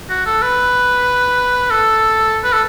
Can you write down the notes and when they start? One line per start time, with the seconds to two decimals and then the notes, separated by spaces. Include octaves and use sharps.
0.10 F#4
0.26 A4
0.42 B4
1.71 A4
2.44 B4
2.53 A4